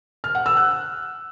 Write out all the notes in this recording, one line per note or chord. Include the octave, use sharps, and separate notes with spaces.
F6
F#5
E6
F#6